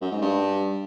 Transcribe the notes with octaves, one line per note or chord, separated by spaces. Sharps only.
F#2
G#2
G2